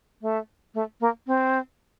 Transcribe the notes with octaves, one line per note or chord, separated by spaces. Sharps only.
A3
A3
A#3
C4